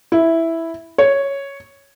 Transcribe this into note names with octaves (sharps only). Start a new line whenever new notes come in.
E4
C#5